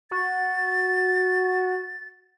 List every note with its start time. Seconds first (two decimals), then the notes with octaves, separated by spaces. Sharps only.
0.11 F#4 A6